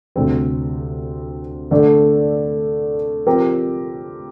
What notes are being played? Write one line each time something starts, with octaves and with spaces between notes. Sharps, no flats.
D2 C3 G3 C4
D3 A3 D4 A4 D5
F3 C4 G4 A#4